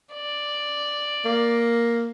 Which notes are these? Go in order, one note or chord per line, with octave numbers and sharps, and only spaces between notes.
D5
A#3